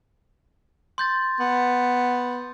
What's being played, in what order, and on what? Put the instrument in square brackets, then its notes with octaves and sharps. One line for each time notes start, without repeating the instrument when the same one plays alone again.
[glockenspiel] C6 G6 A6
[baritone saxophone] B3